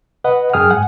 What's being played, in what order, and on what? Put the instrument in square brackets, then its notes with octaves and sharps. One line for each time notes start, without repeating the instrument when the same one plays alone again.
[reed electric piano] B4 D#5 F#5
F#2 G#4 G5 G#5 D#6 F6
G#2 F#5 G#5